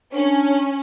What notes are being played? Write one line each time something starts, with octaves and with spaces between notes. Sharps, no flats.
C#4 D4